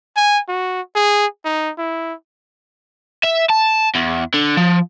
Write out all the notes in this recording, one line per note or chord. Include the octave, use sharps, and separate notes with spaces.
G#5
F#4
G#4
D#4
E4
E5
A5
E2
D3
F3